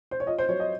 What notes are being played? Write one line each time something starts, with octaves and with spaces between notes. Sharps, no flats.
C5
C#5
F4 D#5
C5
F#3 C#5
D#5